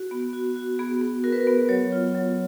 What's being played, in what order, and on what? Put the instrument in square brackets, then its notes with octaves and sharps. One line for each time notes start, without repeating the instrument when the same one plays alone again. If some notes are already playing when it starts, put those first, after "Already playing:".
Already playing: [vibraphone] F#4
B3
F#4
F#4
B3 G#4
B3
F#4 A#4
B4
A#4
B3
F#3 C#5
F4
F#3